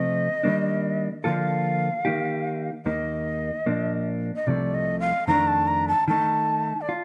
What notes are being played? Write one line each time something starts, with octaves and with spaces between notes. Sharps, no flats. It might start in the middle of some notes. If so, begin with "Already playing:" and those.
Already playing: C3 F3 A3 C4 D#5
D#3 G3 A#3 D4
D3 F3 A#3 F4 A4 F5
D#3 A#3 D#4 G4
D#2 D#3 A#3 D#5
A#2 F3 A#3 D4
D#5
C2 C3 F3 A3 D5
D#5
F5
F2 D#3 A3 D4 A#5
A5
A#5
A5
D#3 A3 D#4 A5
D5
F4